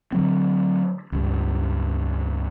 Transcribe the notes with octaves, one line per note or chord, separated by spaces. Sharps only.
D3 F#3 C4
C#2 G2